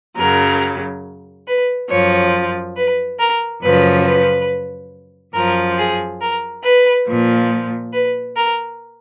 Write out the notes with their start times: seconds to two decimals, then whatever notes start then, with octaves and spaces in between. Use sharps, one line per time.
0.17 F#2 C#3 F#3 A#4
1.47 B4
1.89 F#2 F3 C#5
2.76 B4
3.19 A#4
3.62 F#2 C#3 F3 B4
4.05 B4
5.34 F#2 F3 A#4
5.78 G#4
6.20 A#4
6.63 B4
7.07 A#2 F3
7.93 B4
8.36 A#4